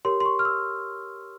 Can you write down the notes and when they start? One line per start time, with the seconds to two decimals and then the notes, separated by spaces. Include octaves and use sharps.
0.05 G4 A#4 C#5 C6
0.20 C6
0.25 C#6
0.39 F6
0.45 E6